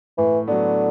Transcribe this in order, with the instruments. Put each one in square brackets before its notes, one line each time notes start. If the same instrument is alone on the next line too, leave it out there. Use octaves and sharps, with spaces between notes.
[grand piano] A2 [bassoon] E3
[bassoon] D3 [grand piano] F#3 B3